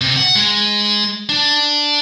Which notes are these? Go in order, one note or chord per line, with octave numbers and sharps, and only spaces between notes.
C3
F#5
G#3
D4